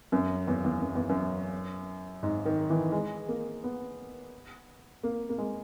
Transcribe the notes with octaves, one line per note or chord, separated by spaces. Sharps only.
F#2
E2
E2
F#2
E2
F#2
G#2
D#3
E3
G#3
A#3
B3
A#3
A#3
G#3